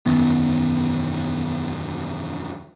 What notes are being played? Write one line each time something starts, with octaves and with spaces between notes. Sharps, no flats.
E1 F#2 D#3 B3